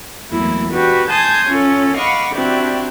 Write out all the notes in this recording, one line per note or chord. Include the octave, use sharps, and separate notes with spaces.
E2 E3 F#3 A3 A#3 E4
D4 F#4 G4 B4
G#5 A5 C6 D#6 G6 G#6
C#4 F4 A4
D#5 F5 F#5 B5 C#6 D6
C4 D4 E4 F#4 G4